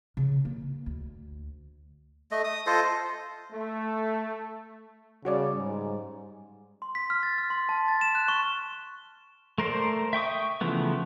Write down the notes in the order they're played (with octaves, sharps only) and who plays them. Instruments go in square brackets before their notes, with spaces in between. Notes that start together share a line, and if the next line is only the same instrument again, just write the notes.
[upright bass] C#3
A#3
D2
[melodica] A3 D#5
D#6
F4 A4 C5 D#5
[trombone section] A3
[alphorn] C#3 [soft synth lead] G3 [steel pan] F#4 C#5 D5
[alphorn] G#2
[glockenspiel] C6
B6
F6
A6
F6
C6
A5
A6
E7
F#6
C#6
[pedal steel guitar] A3 A#4 C5 D5
E5 G5 C#6 D#6
C#3 E3 F3 A3 B3